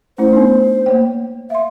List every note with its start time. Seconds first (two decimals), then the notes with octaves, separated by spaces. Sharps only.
0.18 A3 C#4 E4 C5
0.33 B3 D4 D#4
0.86 A#3 C#5 G5
1.50 E5 F5 C6